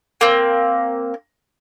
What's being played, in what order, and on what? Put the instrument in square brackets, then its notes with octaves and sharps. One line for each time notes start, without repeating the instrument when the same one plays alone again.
[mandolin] A#3 C4